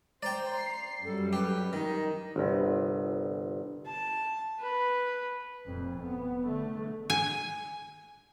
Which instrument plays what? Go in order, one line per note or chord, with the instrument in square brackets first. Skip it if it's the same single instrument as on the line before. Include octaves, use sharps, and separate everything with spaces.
[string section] C5 [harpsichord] D5 G5 [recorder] A#5
[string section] C7
[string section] F#2 G3 [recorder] A4
[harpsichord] G4 [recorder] B4
[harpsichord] D#3 [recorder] D#4
[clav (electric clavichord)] G1 C2
[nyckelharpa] A5
B4
[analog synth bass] F1 [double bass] F2 A#2
[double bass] B3
D3 A3
[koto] G#5